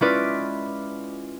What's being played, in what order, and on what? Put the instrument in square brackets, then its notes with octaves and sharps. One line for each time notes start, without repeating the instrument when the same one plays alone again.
[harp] G#3 C#4 E4 F4 B4 D5